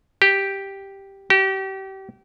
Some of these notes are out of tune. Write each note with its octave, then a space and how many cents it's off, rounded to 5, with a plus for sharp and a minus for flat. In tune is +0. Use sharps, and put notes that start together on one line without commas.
G4 +0
G4 -30